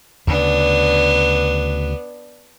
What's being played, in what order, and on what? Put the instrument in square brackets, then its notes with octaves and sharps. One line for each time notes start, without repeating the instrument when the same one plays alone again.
[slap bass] D2 C#3 [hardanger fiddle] B3 D4